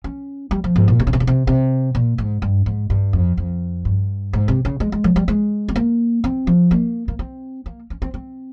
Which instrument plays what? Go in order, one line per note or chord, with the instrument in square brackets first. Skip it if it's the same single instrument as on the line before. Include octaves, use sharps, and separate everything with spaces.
[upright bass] C#4
G3
F3
G#2
A#2
C3
C#3
C3
C#3
C3
C3
A#2
G#2
G2
G#2
G2
F2
F2
G2
G#2
C3
C#3
G#3
G#3
F3
G3
G#3
C4
A#3
C4
F3
A#3
A#3
C4
A#3
C#4
C4
C4